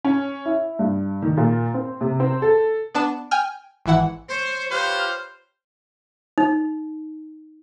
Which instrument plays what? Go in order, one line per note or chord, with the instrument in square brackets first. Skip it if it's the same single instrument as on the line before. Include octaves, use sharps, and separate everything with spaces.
[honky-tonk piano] C#4
E4
G2
D#3
A#2
C4
C3
C4
A4
[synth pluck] B3 D4 A5 E7
G5 G#5 F6
G#1 E3 E4 F#5
[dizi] C5 [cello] C#5
[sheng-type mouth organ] F4 G4 B4 [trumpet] C5 [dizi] F6
[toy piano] D#4